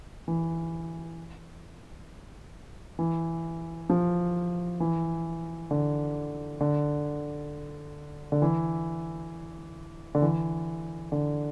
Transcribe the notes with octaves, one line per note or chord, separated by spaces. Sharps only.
E3
E3
F3
E3
D3
D3
D3
E3
D3
E3
D3